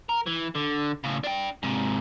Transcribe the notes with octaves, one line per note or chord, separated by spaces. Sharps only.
A#4
E3
D3
A2 C#3
D4 G5
G#2 C3